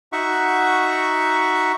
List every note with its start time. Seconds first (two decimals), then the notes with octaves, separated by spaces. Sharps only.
0.12 D#4 F#4 E5 F#5 C#6